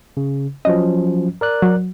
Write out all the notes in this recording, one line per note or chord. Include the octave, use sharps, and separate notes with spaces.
C#3
F3 F#3 C#4 D#5
A#4 D5 F#6
F#3